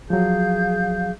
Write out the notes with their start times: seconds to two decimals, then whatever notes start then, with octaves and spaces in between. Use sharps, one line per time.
0.10 F3 F#3 G#4 F5 G6